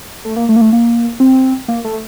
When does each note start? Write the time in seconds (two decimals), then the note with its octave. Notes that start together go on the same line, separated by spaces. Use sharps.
0.25 A3
0.36 A#3
0.49 A3
0.56 A#3
0.61 A3
0.73 A#3
1.20 C4
1.68 A#3
1.85 A3